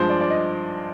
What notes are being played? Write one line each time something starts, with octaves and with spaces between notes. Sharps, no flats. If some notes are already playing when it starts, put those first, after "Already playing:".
Already playing: G2 F3 G#3 C5
D5
D5
D#5